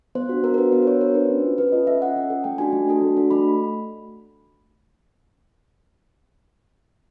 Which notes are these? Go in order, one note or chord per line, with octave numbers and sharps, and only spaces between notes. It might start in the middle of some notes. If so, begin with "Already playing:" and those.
B3 C5
D4 F#4
B3 A#4
A#4
D4 F#4 B4
B3 C5
C5
D4 F#4 C#5
B3 A#4
C5
D4 F#4 B4
C#4
F4 A4
C#4 B4
F4 A4 D#5
C#4 E5
F4 A4 F#5
C#4
F4 A4
A3 G5
D4 F#4 A4 G#5
A3
D4 F#4 A4
A3
D4 F#4 A4
A3 B5